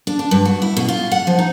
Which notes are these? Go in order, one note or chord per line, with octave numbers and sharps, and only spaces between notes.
D4
D4
G2
F#4
E4
B2
F4
F#5
F3
D#4